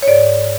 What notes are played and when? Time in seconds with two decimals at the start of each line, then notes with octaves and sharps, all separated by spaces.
0.02 C#5
0.08 G#2 D5